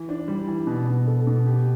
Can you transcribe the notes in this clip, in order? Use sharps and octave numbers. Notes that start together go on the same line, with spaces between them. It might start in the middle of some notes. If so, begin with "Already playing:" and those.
Already playing: E3
D4
G3
E3
B2
B2
A4
B2
G4